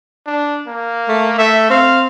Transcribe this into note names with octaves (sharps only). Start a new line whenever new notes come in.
D4
A#3
A3
A3 E5
C4 F5